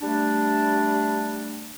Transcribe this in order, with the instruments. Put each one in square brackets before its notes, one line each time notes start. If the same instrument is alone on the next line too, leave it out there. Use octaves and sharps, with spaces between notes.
[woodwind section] G3 A3 D4